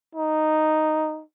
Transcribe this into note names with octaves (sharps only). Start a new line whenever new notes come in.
D#4